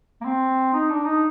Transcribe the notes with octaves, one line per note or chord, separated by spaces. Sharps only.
A#3
C4
D#4
D4
D#4